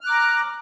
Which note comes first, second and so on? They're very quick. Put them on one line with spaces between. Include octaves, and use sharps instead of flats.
F6 F#6 D6 A#5